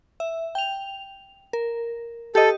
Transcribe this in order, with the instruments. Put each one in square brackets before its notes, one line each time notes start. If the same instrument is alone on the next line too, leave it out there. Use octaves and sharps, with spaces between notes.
[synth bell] E5
G5 F7
A#4
[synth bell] G4 D#5 [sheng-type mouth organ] A4